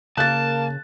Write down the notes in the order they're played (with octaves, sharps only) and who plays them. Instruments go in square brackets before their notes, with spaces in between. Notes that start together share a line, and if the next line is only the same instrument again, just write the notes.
[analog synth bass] C#3 [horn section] A#3 [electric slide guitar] A5 [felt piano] F#6 A6